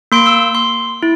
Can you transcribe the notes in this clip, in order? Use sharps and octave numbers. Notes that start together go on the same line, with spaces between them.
A#3 C6 D7
E6
C6
E4